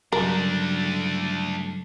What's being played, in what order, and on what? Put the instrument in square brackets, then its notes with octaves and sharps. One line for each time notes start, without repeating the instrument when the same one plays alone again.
[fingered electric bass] G2 C#3 F#3 [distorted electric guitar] A3 D4 [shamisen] A#4